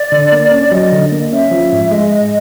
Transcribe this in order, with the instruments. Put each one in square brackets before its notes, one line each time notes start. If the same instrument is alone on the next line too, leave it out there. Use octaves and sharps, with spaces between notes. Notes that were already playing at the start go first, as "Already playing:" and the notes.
Already playing: [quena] D5
[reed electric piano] D3
A#3
C#4
[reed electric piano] F#3 [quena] D#5
[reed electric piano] D3
A#3
[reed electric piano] C#4 [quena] E5
[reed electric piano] F3
G#2
[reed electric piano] G#3 [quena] D#5